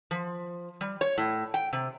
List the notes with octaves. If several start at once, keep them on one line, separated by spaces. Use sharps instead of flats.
F3
G3
C#5
A2
G5
C3